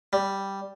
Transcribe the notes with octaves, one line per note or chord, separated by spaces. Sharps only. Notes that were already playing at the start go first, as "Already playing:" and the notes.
G3